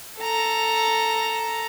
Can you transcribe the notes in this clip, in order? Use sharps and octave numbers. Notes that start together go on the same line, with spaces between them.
A4 A#5